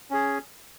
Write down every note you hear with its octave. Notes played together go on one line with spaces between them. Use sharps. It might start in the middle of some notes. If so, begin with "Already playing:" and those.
C#4 G#4